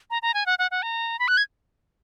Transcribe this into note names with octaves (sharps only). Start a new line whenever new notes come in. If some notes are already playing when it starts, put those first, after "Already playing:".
A#5
A#5
G#5
F#5
F#5
F#5
A#5
B5
F#6
G#6